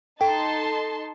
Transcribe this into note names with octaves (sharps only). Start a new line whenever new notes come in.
D#4 A4 G5 A5 C6